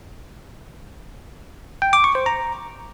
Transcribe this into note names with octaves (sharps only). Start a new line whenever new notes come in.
G5
D6
C#6
C5
A#5